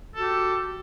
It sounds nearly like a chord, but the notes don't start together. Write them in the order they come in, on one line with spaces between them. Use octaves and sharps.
A4 F#4 G4